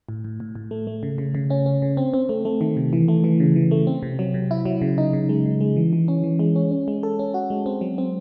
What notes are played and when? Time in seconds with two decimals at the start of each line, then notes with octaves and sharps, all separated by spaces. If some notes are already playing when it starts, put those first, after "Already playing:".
0.09 A2
0.24 A2
0.40 A2
0.55 A2
0.71 A3
0.87 A3
1.03 C#3
1.18 C#3
1.35 C#3
1.50 C#4
1.66 C#4
1.82 C#3
1.97 C4
2.14 C4
2.29 A3
2.45 A3
2.61 D#3
2.77 C3
2.93 E3
3.08 A3
3.24 E3
3.40 C#3
3.56 E3
3.71 A3
3.87 C4
4.03 C3
4.19 F#3
4.34 C3
4.51 E4
4.65 F#3
4.81 C#3
4.98 D#4
5.13 C#3
5.29 G#3
5.45 C#3
5.61 G#3
5.77 E3
5.93 E3
6.08 C#4
6.24 E3
6.39 G#3
6.56 C#4
6.71 C#4
6.88 G#3
7.03 A4
7.19 C#4
7.34 F#4
7.50 G#3
7.66 C4
7.81 F#3
7.98 C4